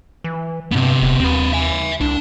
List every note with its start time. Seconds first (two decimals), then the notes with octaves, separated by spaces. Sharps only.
0.24 E3
0.72 G2 C3 B3
1.02 D#1
1.20 D#2 C4 B4
1.53 E5 G#5
2.01 C2 D4